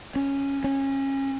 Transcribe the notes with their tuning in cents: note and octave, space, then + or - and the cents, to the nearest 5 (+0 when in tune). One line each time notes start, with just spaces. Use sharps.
C#4 -5
C#4 -25